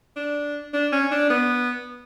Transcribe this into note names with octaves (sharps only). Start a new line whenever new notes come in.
D4
D4
C#4
D4
B3